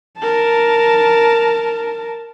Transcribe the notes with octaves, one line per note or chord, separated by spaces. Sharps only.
A#4 A5